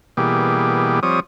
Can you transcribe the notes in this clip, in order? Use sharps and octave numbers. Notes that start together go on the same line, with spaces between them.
B2 E3 G3 A#3 G4 G#4
F3 G3 C4 C#5 D#6